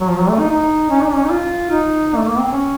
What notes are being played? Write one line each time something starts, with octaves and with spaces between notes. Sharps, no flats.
F#3
F3
F#3
A3
D#4
D#4
C#4
D#4
C#4
D#4
F4
D#4
A3
A#3
C4
C#4